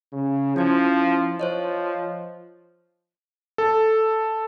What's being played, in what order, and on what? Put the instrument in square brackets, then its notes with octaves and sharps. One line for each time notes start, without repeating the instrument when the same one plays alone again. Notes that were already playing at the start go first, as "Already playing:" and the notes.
[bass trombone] C#3
[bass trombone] F3 [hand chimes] C#4 E4 G#6
[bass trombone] F3 [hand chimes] C5 C#5 D#5
[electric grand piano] A4